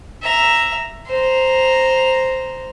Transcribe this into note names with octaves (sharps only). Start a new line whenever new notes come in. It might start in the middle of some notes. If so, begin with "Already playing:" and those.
E5 A#5
C5 A#5